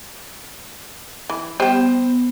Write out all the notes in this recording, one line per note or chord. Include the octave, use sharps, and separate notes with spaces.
E3
G3 B3 G4 C5